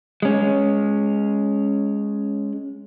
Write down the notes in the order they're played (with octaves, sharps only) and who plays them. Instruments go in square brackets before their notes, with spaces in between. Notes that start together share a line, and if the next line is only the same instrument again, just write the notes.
[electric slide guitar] G#3 C#4